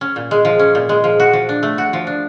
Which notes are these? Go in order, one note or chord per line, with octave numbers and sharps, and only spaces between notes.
C#4
A#2
G#3
F3
C#4
A#2
G#3
F3
F#4
F3
D4
A3
F#4
F3
D4